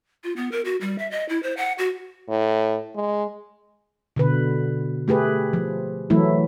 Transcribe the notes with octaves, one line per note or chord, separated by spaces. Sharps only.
F4
B3
A#4
F#4
G3
E5
D#5
E4
C5
F#5
F#4
A2
G#3
B2 D3 B4
A3 G4 G#4 B4
F3
E3 F#3 A3 E4